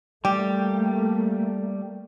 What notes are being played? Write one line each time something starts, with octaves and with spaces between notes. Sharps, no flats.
G3 A3 A#3 G4